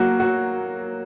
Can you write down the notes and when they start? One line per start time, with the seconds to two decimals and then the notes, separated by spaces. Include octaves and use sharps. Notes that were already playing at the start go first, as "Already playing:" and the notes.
Already playing: F#3 A#3 F#4
0.20 F#4